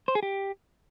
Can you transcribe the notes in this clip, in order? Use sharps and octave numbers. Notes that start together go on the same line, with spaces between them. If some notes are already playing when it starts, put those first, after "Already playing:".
C5
G#4
G4